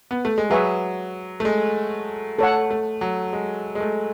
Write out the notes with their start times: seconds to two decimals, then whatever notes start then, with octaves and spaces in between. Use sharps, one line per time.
0.11 B3
0.25 A3
0.38 G#3
0.50 F#3 G#4 B4 E5 G#5 C#6
1.40 A3
1.45 G#3
2.39 A3 A4 C#5 F#5
2.71 A3
3.01 F#3
3.33 G#3
3.75 G#3
3.80 A3